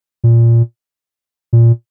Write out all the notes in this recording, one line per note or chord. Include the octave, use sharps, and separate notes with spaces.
A#2
A#2